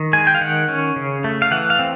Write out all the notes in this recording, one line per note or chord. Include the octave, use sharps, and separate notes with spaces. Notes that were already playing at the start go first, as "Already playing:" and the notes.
Already playing: D#3
G#3 G#5
G5
F5
D#3 F#5
C#4
C#3
A3
F5
E3 F#5
F5
C4